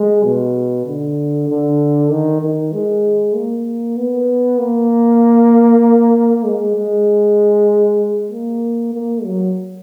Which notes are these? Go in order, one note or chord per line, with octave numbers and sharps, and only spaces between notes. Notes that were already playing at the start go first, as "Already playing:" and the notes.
Already playing: G#3
B2
D3
D3
D#3
D#3
G#3
A#3
B3
A#3
G#3
G#3
A#3
A#3
F#3